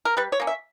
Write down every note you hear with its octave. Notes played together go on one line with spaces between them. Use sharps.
A#4
G3 B4
C#5
A#3 C#4
E5